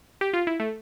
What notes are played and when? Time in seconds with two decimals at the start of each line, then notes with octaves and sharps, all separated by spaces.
0.21 G4
0.33 F4
0.47 E4
0.60 A3